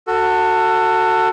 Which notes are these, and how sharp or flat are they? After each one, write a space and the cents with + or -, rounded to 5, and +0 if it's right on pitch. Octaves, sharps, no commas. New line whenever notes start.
F#4 +0 A4 +25